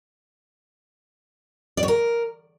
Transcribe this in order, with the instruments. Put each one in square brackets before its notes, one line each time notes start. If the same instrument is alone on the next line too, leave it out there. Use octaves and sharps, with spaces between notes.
[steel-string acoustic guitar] D5
C#5
A#4